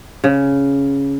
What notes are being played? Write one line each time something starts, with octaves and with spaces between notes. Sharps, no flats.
C#3